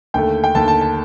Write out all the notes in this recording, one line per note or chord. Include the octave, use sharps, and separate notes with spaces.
D#2 D3 A3 G5
G5
D#2 D3 A3 A5
A5
A5